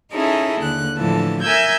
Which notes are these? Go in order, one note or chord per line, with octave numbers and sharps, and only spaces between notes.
C#4 D#4 E4 G#4 A4 E5
D#2 D3 F#6
A2 D3 E3 F3 A5
A#4 E5 G#5 E6 G6 G#6